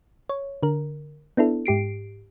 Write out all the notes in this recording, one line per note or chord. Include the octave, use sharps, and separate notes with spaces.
C#5
D3 A#4
B3 D4 E4 A4
G#2 G4 C7 D7